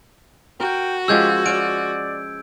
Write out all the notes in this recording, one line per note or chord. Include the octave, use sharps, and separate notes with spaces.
F#4 A#4 G5
F3 G#3 C#4 G4 E6 G6 G#6
C#4 D5 D7